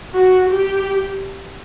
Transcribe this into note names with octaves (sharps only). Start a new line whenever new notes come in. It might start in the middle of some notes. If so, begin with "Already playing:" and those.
F#4
G4